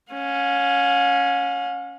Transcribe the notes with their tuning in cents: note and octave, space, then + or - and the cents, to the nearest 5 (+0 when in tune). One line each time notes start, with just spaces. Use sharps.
C#4 +0 F5 +45